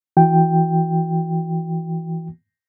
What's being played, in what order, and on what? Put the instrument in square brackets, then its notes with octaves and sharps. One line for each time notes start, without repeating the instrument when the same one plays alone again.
[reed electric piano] E3 F#4 G5